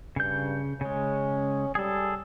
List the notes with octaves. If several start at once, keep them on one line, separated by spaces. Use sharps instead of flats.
G2 C#3 G6
C#3 G#3 C#4
G3 G#4 A4